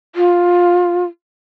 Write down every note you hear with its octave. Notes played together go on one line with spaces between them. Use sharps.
F4